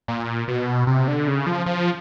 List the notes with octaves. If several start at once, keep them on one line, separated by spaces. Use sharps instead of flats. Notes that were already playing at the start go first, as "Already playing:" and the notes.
A#2
B2
C3
D3
C#3
F3
F3